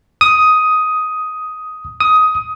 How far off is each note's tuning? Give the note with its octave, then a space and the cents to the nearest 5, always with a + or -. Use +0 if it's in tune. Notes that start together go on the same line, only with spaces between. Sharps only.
D#6 +10
D#6 +15